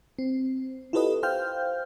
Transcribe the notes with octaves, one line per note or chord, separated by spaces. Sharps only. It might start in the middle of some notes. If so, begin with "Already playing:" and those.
C4
E4 F4 G4 A4 B4 D#5
C5 F5 G5 F6 G6